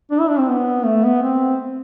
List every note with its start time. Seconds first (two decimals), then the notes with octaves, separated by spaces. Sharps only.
0.11 D4
0.20 E4
0.29 D4
0.39 C4
0.48 B3
0.85 A3
1.04 B3
1.23 C4